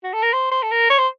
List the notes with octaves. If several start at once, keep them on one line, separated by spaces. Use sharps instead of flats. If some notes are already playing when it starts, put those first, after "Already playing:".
F#4
A4
A#4
C5
C5
A4
A#4
C#5
C5